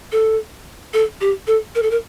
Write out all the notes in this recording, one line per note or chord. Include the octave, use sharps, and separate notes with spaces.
A4
A4
G4
A4
A#4
A4
A#4